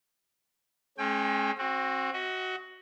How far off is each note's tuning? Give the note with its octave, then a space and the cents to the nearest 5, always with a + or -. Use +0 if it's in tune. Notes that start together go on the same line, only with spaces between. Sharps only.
G#3 +30 C#4 -30 G5 +25
C4 +25 F#4 -5
F#4 +10 D#5 +45